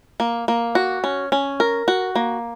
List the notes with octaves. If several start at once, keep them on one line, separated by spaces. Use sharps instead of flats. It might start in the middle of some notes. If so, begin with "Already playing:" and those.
A#3
A#3
F#4
C#4
C#4
A#4
F#4
A#3